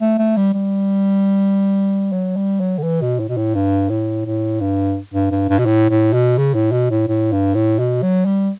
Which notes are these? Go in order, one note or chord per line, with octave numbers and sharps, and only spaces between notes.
A3
A3
G3
G3
F#3
G3
F#3
D3
E3
B2
A2
B2
A2
G2
A2
A2
G2
G2
G2
G2
B2
A2
A2
B2
C#3
A2
B2
A2
A2
G2
A2
B2
F#3
G3